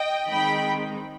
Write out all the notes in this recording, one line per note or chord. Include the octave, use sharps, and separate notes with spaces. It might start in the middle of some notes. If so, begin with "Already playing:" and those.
Already playing: D#5 G5
D#3 G#3 C4 D#4 G5 B5